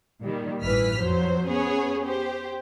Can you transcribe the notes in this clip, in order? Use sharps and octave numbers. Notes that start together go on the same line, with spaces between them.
A#2 D#3 G3
A1 G2 E3 B4 F6 B6
F2 F3 F#3 C5
B3 C#4 G#4 C#5
G4 C5